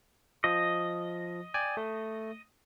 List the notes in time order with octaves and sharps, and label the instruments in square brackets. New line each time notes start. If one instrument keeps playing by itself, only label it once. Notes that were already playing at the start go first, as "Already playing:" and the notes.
[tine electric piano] F3 [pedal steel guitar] D#5
[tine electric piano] D5 G5 G#5
A3